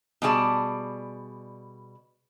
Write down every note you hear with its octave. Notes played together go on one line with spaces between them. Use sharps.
B2 G3 G#4 D5 E5 A5